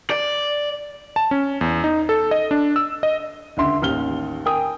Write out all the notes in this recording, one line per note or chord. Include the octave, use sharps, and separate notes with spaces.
D5
A5
C#4
E2
D#4
A4
D#5
D4
E6
D#5
C#2 D3 E5 C6
A1 D#2 F6 G7
A#4 G5 G#5 D#6